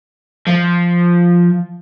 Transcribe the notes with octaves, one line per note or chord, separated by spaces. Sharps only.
F3